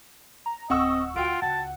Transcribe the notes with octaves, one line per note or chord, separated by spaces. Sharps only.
A#5
D1 C4 D#5 F#5 C#6 E6
D2 F4 F#4 G5 D7
C#2 F#5 A5